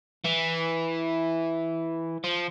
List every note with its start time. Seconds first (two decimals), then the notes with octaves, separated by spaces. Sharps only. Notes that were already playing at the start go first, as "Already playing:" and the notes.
0.24 E3
2.24 F3